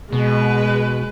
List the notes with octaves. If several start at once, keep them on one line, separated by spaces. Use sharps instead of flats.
B2 G#3 B4